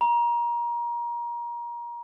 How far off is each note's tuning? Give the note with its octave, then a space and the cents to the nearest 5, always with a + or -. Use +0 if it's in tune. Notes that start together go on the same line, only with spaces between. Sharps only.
A#5 +25